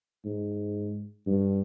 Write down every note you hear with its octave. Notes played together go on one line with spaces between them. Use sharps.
G#2
G2